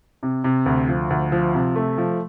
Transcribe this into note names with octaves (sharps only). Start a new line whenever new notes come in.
C3
C3
D2
F3
D2
F3
C3
A3
F3